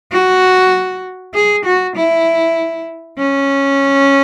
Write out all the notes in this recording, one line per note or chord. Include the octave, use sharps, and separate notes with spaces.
F#4
G#4
F#4
E4
C#4